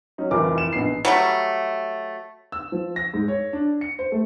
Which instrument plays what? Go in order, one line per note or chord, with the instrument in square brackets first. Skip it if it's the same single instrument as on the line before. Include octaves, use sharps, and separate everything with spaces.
[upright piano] F#3 C#4 D#4
F1 C2 E3 F3 A#4 D6
E7
A#1 B3 D#4 C7
[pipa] F#3 G3 A3
[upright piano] E6
F3
A#6
G#2
C#5
D4
C#7
C5
A3